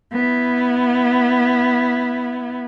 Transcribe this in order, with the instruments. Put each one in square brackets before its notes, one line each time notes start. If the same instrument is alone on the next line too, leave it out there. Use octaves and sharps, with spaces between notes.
[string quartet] B3 E4